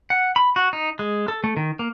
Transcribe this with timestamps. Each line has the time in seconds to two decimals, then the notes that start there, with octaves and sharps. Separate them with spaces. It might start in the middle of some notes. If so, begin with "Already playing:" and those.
0.10 F#5
0.36 B5
0.56 F#4
0.73 D#4
0.99 G#3
1.28 A4
1.44 A3
1.57 D#3
1.79 A#3